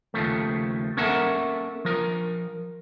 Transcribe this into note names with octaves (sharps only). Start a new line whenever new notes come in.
D#2 C#3 F3 A3
A#3 C#4 A4 A#4 E5 F#5
F3 A#4